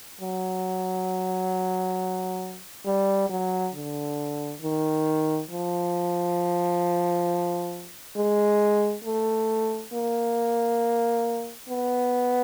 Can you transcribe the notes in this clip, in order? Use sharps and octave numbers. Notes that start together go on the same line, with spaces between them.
F#3
G3
F#3
D3
D#3
F3
G#3
A3
A#3
B3